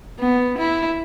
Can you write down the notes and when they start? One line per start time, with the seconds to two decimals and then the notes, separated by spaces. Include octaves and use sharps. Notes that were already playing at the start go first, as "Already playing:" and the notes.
0.19 B3
0.58 E4